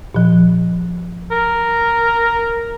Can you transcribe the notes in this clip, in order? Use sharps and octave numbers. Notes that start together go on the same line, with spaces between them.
A#2 F3
A#4